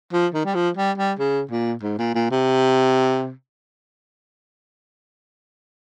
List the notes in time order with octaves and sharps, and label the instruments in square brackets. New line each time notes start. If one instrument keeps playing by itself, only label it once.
[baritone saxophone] F3
D#3
G3
F3
G3
G3
C#3
A#2
G#2
A#2
A#2
C3